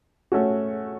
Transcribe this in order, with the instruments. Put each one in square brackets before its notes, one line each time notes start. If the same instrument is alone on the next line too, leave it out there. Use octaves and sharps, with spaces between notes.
[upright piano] A3 C#4 F#4